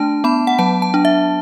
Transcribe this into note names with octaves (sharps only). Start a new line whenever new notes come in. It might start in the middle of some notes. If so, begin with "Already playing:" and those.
Already playing: A3 D4 A5
B3 B5
F#5
F#3 A5
A5
D4
E5